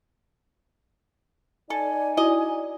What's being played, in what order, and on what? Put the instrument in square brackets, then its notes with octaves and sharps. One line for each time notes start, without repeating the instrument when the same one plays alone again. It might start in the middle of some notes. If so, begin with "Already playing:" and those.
[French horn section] D#4 D5 [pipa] A4 [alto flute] G#5
[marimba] E4 F#4 [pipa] D#5